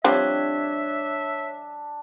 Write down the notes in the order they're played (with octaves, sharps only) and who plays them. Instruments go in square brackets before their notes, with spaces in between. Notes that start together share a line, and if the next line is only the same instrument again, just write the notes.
[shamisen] F3 G3 C4 [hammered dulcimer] D4 [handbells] C#5 F#6 [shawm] E5